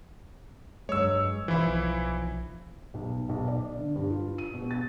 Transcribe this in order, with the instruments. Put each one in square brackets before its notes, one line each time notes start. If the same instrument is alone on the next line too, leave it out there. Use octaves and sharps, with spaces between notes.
[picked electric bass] G2 F#3 G#3 [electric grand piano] C#5 E6
[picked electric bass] B1 F3 [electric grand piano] E3 E4
[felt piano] B1
B1
D5
D3
G2
F4
D#7
B2
A6